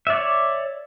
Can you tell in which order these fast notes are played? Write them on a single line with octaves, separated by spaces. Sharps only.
E5 D5 C#5